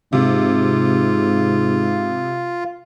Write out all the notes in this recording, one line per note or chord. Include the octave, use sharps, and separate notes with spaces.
G#2 C3 F4